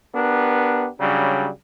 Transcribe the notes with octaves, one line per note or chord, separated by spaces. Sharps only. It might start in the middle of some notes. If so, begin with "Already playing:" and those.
B3 D4 G4 A#4
C#3 F#3 G3 D4